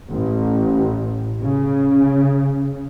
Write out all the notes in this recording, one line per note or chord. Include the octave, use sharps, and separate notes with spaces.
A1
C#3